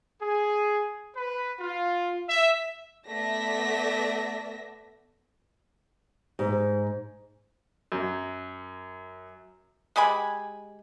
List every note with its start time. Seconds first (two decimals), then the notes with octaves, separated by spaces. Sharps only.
0.21 G#4
1.14 B4
1.60 F4
2.29 E5
3.07 A3 B3 D5 E5 A#6 B6
6.39 G#2
7.92 F#2
9.96 G#3 G4 G#5 B5